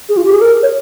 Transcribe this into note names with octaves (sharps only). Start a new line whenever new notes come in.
G#4
F4
G4
G#4
A#4
C#5